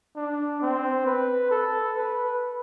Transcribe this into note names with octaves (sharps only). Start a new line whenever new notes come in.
D4
C4
B4
A4
B4